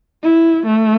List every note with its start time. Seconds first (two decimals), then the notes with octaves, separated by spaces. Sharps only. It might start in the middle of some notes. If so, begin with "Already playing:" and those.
0.23 E4
0.66 A3